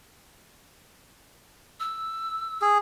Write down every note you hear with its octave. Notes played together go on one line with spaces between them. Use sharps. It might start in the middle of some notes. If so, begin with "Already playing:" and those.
E6
G#4